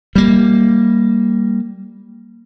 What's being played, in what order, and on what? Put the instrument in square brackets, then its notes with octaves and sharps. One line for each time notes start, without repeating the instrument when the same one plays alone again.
[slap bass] G3 A#3